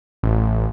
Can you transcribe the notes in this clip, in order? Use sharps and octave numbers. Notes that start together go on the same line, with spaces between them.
A1